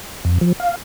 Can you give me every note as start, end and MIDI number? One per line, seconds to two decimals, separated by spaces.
0.25 0.38 41
0.41 0.53 53
0.60 0.76 77